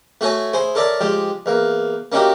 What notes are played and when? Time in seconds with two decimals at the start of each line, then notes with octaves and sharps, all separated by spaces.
0.21 A3 F#4 A4 C#5 G#5
0.53 E4 G#4 C5
0.75 A4 A#4 C#5 D5 E5 A5
1.01 F3 G#3 G4
1.46 E2 A#3
2.12 A#3 C#4 D#4 E4 F#4 G4